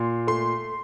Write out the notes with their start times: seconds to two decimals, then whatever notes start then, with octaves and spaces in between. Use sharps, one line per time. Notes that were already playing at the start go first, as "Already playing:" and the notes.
Already playing: A#2 C6
0.27 A3 C6